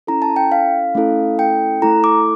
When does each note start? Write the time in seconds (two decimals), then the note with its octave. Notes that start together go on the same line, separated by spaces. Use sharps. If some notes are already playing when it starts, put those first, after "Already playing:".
0.07 C#4 E4 A4 A#5
0.22 A5
0.36 G5
0.52 F5
0.95 A3 C#4 E4 A4
1.39 G5
1.82 A3 E4 A4 A#5
2.04 D6